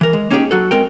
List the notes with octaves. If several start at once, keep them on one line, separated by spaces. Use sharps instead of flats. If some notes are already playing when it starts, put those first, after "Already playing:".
E3 A#4
G#3
A#3 C#4 D#4 F4 G4 G#4
F#3 F#4 A4
G#3 C4 A#4 G5